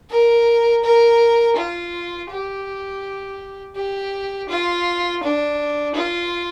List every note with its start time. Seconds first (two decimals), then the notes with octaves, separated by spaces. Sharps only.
0.10 A#4
0.84 A#4
1.56 F4
2.30 G4
3.76 G4
4.49 F4
5.23 D4
5.95 F4